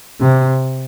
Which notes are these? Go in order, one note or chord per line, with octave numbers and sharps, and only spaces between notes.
C3